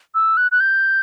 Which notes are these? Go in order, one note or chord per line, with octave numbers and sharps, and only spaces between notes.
E6
F#6
F#6
G6